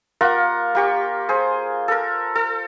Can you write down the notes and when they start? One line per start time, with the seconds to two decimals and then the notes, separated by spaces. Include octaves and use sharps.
0.21 A#3 F4 A#4 F#5
0.75 A#3 G4 C#6
1.29 G#4 C5
1.88 A4 A#4
2.36 A4